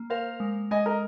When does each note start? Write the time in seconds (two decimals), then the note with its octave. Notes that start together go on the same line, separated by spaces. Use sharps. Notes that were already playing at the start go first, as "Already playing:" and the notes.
Already playing: A#3
0.10 A#4 C5 F5
0.40 G#3
0.71 G#3 D#5 G#5
0.86 A#4 D#5